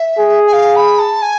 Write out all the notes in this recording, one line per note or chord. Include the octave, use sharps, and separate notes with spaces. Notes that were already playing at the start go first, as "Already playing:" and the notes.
Already playing: E5
G#4
G#5
F5
B5
A5
G#5